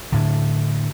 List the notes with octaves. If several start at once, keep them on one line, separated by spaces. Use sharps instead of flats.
A2 D3